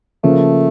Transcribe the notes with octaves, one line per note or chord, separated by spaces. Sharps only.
C#3 F3 A3 A#3